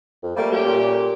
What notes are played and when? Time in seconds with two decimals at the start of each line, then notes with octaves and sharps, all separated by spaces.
0.23 F2
0.37 G3 A3 A#3
0.52 A#3 C#4 G4
0.66 A#2